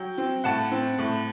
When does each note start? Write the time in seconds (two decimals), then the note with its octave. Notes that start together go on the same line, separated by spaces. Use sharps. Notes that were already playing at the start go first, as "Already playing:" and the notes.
Already playing: F#3 G5
0.18 C4
0.44 A2 F#5 A5
0.71 C4
0.99 A2